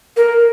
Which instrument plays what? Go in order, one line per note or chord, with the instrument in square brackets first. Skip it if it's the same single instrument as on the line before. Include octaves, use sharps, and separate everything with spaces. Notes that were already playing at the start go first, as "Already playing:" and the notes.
[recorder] A#4